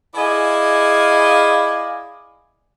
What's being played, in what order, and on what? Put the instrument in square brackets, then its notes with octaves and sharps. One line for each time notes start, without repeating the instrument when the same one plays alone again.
[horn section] E4 G#4 D5 D#5 F5 G#5